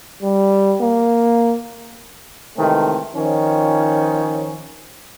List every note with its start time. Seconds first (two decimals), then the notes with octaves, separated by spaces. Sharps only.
0.23 G3
0.81 A#3
2.57 C3 D#3 E3 G#3 A3 C4
3.15 D#3 F3 C#4